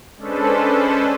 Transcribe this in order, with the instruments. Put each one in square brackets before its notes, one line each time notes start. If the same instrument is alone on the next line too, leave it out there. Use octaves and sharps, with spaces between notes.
[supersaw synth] G#3 C#4 D4 A4 B4 C5